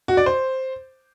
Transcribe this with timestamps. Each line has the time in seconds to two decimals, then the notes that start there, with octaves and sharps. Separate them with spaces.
0.08 F#4
0.17 D5
0.26 C5